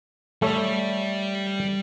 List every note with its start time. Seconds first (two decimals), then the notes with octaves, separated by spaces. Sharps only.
0.42 G3 A3 A4 C#5